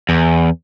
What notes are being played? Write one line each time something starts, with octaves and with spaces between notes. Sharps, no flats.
E2